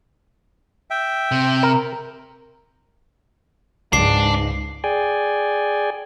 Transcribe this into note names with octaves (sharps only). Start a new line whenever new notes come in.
E5 G5
C3
A#4
C#2 G#2 G#3 D4 D#4 C7
G#4 D5 G5 G#5